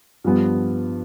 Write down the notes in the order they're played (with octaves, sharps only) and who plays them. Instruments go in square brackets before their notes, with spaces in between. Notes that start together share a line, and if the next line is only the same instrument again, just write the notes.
[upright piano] G2 F3 B3